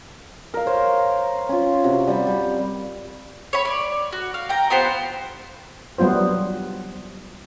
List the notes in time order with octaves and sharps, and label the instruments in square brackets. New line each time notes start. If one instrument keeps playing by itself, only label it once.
[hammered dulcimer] A#4 F5
C5 C#5
C#4 F4
C3 F#4
G3 B5
G3
[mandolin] C#5 B5
D5
F#4
F5
G5 A#5
B3 F4 G4 C5
[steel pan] F#3 G3 B3 F4 C5